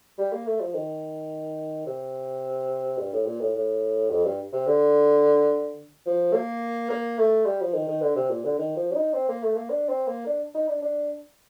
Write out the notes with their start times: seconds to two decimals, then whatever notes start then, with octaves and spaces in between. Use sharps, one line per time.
0.18 G3
0.32 A#3
0.47 A3
0.60 F3
0.75 D#3
1.87 C3
2.98 G2
3.13 A2
3.26 A#2
3.41 A2
3.55 A2
4.10 F2
4.25 G2
4.53 C3
4.67 D3
6.06 F3
6.34 A#3
6.90 A#3
7.19 A3
7.46 G3
7.61 F3
7.74 D#3
7.88 D#3
8.02 D3
8.16 C3
8.30 A#2
8.44 D3
8.59 D#3
8.77 F3
8.92 D4
8.96 D#4
9.14 C4
9.29 A#3
9.43 A3
9.56 A#3
9.70 D4
9.89 C4
10.07 A#3
10.26 D4
10.54 D#4
10.68 D4
10.82 D4